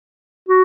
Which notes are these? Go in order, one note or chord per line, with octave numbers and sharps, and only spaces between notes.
F#4